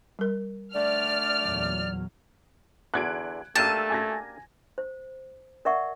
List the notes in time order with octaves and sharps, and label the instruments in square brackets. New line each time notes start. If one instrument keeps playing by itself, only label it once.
[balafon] G3 A#4
[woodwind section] D3 A3 D5 [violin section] F6
[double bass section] E2 A#2 F#3
[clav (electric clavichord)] E2 D3 [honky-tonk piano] F#6 G#6 D7
[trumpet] A3 [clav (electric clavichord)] A#3 D4 G4 [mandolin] A5 [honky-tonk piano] E6 D#7 E7
[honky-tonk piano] G#5 G#6 A#6
[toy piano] C5
A#4 D5 E5 F#5 C#6